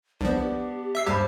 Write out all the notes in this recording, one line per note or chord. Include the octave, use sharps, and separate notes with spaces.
C2 F3 B3 D4 C5
G4
E5 E6 C7
G2 G4 C5 B5